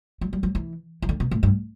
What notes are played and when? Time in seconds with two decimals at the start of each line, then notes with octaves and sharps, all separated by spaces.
0.21 F#3
0.33 G3
0.43 F#3
0.55 E3
1.02 E3
1.09 D3
1.20 B2
1.31 A2
1.43 G2